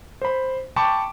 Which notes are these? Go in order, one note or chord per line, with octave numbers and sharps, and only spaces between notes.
C5 B5
G5 A5 B5 C#6 D6